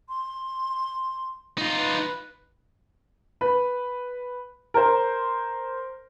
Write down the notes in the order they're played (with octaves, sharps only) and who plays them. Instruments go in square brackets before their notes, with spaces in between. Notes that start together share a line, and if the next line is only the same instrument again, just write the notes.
[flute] C6
[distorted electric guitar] D#4 F4
[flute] B4
[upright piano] B4
A#4 C5